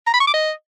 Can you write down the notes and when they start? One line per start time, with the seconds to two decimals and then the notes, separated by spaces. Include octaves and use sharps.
0.07 A#5
0.14 B5
0.20 C#6
0.27 D6
0.34 D#5